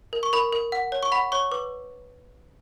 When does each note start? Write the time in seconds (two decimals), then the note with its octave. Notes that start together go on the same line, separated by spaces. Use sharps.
0.13 A#4
0.23 C#6
0.33 A#4 B5
0.53 A#4
0.72 F#5
0.92 C#5
1.03 C#6
1.12 F#5 B5
1.32 C#5 C#6
1.51 B4 D6